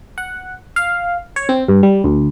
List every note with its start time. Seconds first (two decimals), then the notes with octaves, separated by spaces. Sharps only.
0.18 F#5
0.76 F5
1.36 C#5
1.49 C4
1.68 G2
1.83 G3
2.04 D2